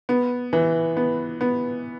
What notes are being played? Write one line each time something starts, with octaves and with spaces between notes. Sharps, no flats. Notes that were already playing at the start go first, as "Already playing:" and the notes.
B3
E3
B3
B3